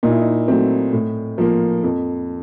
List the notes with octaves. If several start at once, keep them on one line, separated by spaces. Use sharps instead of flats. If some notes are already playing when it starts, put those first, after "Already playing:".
A#2 D#4
E4
D#4
F#3 A3 C4
A2
F3 A#3
F2